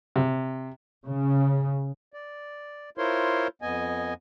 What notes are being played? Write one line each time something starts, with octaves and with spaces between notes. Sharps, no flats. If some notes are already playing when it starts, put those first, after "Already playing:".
C3
C#3
D5
E4 F4 A#4 C5 C#5 C6
F2 B3 D#5 G#5